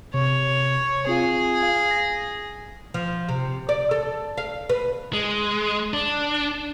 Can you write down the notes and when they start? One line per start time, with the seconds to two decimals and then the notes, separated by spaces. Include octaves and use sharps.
0.14 C3 C#5
1.07 C4 F4 G#4 F5
1.63 F5
1.91 A#6
2.94 F3
3.29 C3
3.69 D5
3.91 A4
4.38 F5
4.69 B4
5.13 G#3
5.93 D4